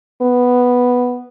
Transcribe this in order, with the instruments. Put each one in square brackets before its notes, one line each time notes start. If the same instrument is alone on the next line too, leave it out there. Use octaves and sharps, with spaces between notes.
[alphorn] B3